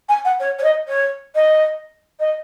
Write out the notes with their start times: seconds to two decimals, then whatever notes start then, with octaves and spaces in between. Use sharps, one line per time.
0.09 G#5
0.25 F#5
0.40 C#5
0.59 C#5
0.63 D#5
0.88 C#5
1.35 D#5
2.19 D#5